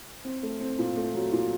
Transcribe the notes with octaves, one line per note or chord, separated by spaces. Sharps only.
C4
A3
C4
A#2
A3
F#3
A#2